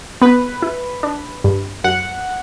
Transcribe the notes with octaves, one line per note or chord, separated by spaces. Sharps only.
B3 B4
E4
D4
G2
F#2 F#5